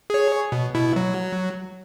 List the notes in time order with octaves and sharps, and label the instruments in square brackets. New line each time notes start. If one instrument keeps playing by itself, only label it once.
[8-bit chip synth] G#4 C#5
B2
B2 E4
F#3